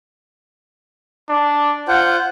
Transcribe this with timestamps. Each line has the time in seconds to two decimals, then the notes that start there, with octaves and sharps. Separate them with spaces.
1.29 D4
1.88 F4 C5 F#5